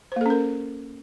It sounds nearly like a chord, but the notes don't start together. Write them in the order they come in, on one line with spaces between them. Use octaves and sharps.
C5 A#3 A4 C#4 A#4